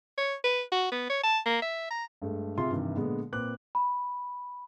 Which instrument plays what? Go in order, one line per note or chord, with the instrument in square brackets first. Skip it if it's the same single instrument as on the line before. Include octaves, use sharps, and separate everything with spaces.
[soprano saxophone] C#5
B4
F#4
B3
C#5
A5
A#3
E5
A#5
[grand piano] G2 G#3 A3
C3 F4 G#4 E5 C6
G2 C3 D#3 E3
A#2 D3 G#3 B3
A#2 C4 B4 D6 F#6
[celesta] B5